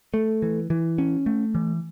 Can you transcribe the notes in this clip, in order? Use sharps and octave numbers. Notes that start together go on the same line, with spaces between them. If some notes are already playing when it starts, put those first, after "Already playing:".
A3
E3
E3
C#4
A3
E3